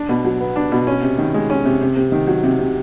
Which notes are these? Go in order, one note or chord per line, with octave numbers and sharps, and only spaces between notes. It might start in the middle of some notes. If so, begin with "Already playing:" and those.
Already playing: D4
B2
F#3
B3
D4
B2
C#4
C3
D#3
G#3
C#4
C3
C3
C3
D#3
F#3
C3
C3